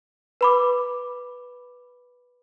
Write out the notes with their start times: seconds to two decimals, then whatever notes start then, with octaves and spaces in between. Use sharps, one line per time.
0.41 B4 B5 D6